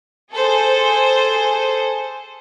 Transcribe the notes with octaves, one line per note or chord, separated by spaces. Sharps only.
G#4 A4 C5